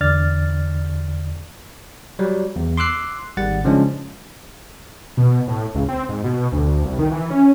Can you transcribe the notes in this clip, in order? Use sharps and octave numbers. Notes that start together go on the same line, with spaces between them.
E2 D3 D5 F6 A6
F#3 G3
E2
C6 D6 E6 F#6 C7
G#1 G3 F#5 A6
C#3 F3 G#3 C#4 D4
B2
A2
C#2
C4
G#2
B2
D2
C2
D#3
E3
C#4